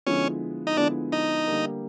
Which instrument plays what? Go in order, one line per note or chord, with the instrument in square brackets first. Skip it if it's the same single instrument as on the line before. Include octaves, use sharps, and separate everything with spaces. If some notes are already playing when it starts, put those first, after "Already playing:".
[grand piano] D3 F3 G#3 B3 E4 [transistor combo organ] C#4
[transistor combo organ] D#4
[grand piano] D3 F3 G#3 B3 E4 [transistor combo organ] D4
[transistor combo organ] D#4
[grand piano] D3 G3 A#3